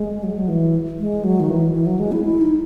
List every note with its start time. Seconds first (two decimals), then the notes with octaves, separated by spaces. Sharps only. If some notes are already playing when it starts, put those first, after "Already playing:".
Already playing: G#3
0.23 F#3
0.31 G#3
0.38 F#3
0.48 E3
0.99 G#3
1.24 F#3
1.40 D#3
1.49 E3
1.74 E3
1.86 F#3
1.99 G#3
2.12 E4
2.25 E4
2.41 D#4